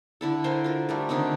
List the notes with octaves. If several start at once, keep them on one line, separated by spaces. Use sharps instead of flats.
D3 E4 A4
A#4 C5 G5 G#5
F4 A#4
G3 A3 A#4
D3 D#3 C4 D#4